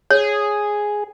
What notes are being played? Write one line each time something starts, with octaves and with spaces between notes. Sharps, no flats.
G#4 C#5